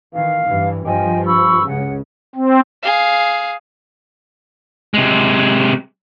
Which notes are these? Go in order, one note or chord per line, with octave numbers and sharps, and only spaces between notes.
D#3 E3 F5
G2 E3
G2 F3 D#5 G5 G#5
B5 C#6 E6
C#2 C#3 F#5
C4
G#4 F5
C3 G#3